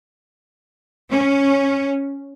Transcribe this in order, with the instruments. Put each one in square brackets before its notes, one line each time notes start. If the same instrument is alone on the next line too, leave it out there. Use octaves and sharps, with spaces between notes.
[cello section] C#4